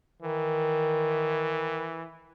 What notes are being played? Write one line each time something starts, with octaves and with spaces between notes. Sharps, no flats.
D#3 E3